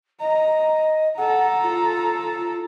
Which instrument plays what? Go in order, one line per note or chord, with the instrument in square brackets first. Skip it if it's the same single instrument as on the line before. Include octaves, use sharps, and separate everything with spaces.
[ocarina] D#5 [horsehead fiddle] A#5
[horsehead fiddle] A4 A#5 [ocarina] F#5
[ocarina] F4